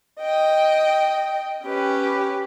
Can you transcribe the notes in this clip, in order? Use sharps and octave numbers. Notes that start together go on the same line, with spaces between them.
D#5 G5
C#4 G4 B4